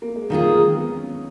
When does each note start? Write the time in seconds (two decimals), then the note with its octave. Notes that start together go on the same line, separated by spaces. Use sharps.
0.02 A#3
0.16 G#3
0.30 D#3 F#3 A#3 F4 G#4
0.52 G#3
0.75 B3
0.97 C#4